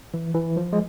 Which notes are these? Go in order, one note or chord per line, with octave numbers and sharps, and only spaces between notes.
E3
E3
F3
G#3